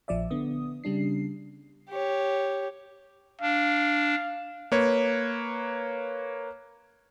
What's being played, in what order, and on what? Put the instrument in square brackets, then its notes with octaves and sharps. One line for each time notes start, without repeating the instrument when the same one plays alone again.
[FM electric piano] A#1 F3 D5 E5
D3 B3 D#6
C#3 G3 D4 C7
[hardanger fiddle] G4 C#5
[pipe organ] D4 [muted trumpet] F5
[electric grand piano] A#3 B4 C#5